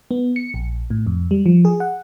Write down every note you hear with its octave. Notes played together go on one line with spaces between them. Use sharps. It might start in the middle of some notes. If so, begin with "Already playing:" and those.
B3
C#7
A#1
A2
F2
G3
F3
G#4
F#5